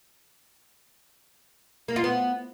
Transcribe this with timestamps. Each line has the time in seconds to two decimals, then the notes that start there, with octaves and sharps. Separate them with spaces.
1.88 A#3
1.96 F4
2.04 B3